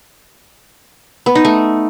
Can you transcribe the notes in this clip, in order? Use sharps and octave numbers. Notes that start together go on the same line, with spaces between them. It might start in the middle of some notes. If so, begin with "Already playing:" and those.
B3
D#4
A3